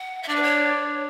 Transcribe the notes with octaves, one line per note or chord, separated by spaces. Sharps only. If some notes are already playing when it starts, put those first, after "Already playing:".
Already playing: F#5
E5
D4 D5
B4
C#5